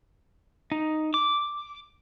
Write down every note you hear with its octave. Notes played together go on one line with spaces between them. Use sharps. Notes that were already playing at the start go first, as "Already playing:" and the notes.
D#4
D6